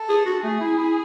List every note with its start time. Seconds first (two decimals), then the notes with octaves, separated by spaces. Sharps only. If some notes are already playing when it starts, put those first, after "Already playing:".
Already playing: A4
0.09 G#4
0.26 F#4
0.43 A3 G#4
0.60 E4
0.78 E4